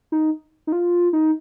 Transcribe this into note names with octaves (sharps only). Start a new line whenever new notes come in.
D#4
D#4
F4
D#4